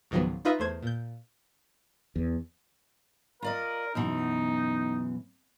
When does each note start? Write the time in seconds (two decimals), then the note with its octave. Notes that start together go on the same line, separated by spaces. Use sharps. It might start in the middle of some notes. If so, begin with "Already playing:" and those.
0.11 C#2 G#2 D#3 F3 F#3 B3
0.45 D#4 F4 B4 D#5 E5
0.59 E2 A3 C5 G#6
0.83 A#2 G6
2.16 E2
3.42 F4 A#4 D5 D#5
3.95 F#2 B2 E3 D#4